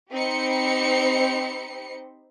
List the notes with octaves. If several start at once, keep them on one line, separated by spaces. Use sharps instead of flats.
C4 D#4 G4 C5 B5 C#7